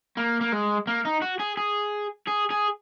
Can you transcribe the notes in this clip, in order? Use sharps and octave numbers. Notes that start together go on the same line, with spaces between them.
A#3
A#3
G#3
A#3
D#4
F#4
G#4
G#4
G#4
G#4